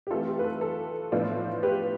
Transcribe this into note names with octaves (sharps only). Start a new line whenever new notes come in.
G4
E3 A3 C4 F4 A4
G4
B4
A4
A4
A2 F3 B3 D4 F4
G4 B4